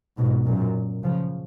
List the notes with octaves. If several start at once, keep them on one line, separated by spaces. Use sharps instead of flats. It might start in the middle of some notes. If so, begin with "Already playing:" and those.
G#2 B2
F#2 A#2
C#3 F3